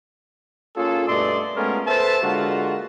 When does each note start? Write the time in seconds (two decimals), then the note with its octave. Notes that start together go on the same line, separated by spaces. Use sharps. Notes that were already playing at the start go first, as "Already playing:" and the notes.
0.77 A#3 C#4 F4 G#4 A4
1.08 G2 B2 A3 D5 D#5 C6
1.56 G#3 A3 B3 C#4 F4 A#4
1.87 A4 B4 C5 E5 A5
2.23 D3 G#3 A#3 F4 F#4